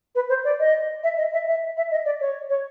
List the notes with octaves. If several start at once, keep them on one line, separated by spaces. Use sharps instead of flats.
B4
C5
D5
D#5
E5
D#5
E5
E5
E5
D#5
D5
C#5
C#5